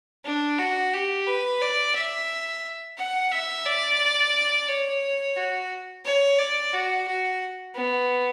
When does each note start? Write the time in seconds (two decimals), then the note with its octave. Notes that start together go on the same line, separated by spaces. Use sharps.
0.24 D4
0.58 F#4
0.93 G4
1.27 B4
1.61 D5
1.95 E5
2.98 F#5
3.31 E5
3.66 D5
4.68 C#5
5.36 F#4
6.05 C#5
6.39 D5
6.73 F#4
7.07 F#4
7.75 B3